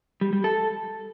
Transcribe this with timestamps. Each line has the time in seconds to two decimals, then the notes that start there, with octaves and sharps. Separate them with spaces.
0.21 G3
0.33 G3
0.44 A4